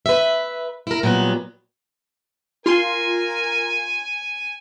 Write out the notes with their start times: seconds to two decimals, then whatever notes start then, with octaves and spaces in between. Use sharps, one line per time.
0.06 B4 E5
0.87 E4 A#4
1.03 A#2 F#3 G3 B3
2.66 F4 A#4 G#5 C6